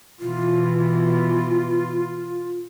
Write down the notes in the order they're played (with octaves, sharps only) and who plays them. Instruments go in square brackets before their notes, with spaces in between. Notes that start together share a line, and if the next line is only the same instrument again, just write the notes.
[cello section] B2 E3 [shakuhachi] F4